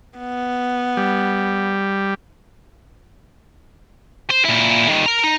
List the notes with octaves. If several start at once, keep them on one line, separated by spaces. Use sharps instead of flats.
B3
G3
C5
A#2 E4
D#3 G3
A#4 A#5
D#4